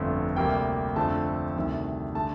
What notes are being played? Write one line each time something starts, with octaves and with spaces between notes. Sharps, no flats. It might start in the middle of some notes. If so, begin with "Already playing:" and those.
Already playing: G1 F2 D3 A3 F5
D2 C3 G3 A#3 G5
F2 D3 F3 A3 A5
D2 C3 D#3 G3
D3 A3 A5